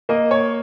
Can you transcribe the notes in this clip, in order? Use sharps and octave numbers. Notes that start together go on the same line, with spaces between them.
A#3 D#5
C#5